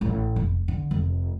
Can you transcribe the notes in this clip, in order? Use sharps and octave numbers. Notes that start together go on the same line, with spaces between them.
A1 A2
F1
D3
F1